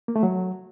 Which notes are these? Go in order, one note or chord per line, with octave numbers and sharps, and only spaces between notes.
A#3
A3
F#3